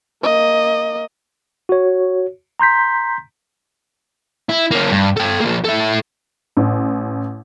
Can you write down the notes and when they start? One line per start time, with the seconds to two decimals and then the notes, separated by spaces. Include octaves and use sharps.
0.23 A#3 D#5
1.69 F#4 C#5
2.59 A#5 C6 G6 B6
4.49 E4
4.71 A#3 C#4
4.91 G2
5.17 A4 G5
5.40 F3 A#3
5.65 E4 A4
6.57 A1